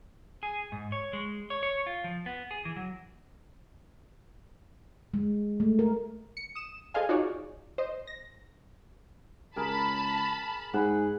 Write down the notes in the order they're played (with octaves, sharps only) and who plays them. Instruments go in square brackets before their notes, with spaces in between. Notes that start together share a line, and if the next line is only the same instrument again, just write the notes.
[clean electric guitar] G#4
G#2
C#5
G#3
C#5
C#5
F4
F3
B3
G#4
E3
F#3
[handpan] G#3
A3
A#4
[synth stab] C#7
D#6 E7
G#4 A4 C5 D#5 F5 G#5
D#4 F4 F#4 G#4 C#5 D5
C5 D#5
A#6
[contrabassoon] C#2 [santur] G#4 A#4 [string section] A5 B5
[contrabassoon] G#2 [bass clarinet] G#4 [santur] F#5 B5